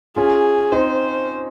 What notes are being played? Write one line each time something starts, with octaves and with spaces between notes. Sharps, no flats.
C#4 F4 G#4
C4 D#4 C5